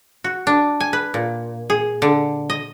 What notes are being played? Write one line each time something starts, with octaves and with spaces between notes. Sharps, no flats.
F#4
D4
G#5
B4
A#2
G#4
D3
D#5